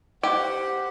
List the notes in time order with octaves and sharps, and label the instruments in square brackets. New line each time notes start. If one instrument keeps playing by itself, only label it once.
[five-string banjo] G4 [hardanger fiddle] C5 F#5